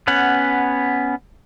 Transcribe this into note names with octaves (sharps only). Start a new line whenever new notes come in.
B3 C#4 F#5